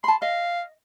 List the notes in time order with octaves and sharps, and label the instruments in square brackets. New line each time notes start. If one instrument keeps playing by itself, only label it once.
[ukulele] A5 B5 [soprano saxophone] C6
[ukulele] D#5 [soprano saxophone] F5